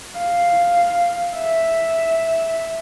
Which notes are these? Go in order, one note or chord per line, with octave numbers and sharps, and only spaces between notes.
F5
E5